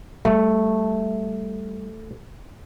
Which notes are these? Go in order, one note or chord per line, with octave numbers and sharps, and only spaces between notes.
G3 A3